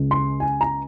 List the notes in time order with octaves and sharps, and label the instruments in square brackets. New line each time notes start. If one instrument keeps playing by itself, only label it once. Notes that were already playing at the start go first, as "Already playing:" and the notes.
Already playing: [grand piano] C#2 C#3 G#3
C6
G#5
A#5